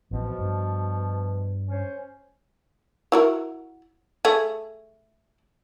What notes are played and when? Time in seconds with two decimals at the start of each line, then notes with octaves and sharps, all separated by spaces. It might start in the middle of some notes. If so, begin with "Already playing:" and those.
0.11 A1 B2 F3 C4
0.38 G2
1.68 C#4 C5
3.12 E4 F#4 A#4
4.25 A3 G#4